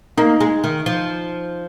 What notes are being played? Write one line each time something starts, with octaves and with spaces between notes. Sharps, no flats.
A#3 D#4
G#3
D#3
F3